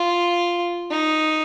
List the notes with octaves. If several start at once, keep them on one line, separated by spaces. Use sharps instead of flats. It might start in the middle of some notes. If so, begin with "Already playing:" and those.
Already playing: F4
D#4